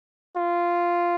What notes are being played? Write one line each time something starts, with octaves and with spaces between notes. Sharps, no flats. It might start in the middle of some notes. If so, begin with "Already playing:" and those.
F4